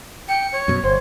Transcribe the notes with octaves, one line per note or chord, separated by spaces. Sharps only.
G5 C#7
C#5
F#2 B2
G1 C5